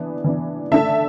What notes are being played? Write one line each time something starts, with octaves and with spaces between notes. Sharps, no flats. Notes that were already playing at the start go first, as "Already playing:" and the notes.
Already playing: E3 B3 D4
E3 B3 D4
D3 A3 D4 E5 A5